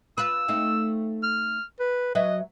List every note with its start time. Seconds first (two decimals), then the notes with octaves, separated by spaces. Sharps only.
0.18 F4 B4 E6
0.48 A3 C4 D#4
1.23 F6
1.80 B4
2.15 F#3 B4 D#5 E5